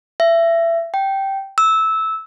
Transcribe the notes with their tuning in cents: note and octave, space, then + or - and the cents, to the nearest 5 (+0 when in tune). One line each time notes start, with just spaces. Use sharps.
E5 +25
G5 -10
E6 -15